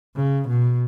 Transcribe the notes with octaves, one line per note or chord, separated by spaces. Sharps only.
C#3
B2